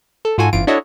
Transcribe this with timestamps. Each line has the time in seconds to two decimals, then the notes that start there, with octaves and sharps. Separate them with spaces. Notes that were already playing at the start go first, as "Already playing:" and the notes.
0.25 A4
0.38 G#2 F4 F#4 A4 G#5
0.53 G1 F#2 E3 F4 D7
0.67 D4 E4 F#4 A4 C#5 D#5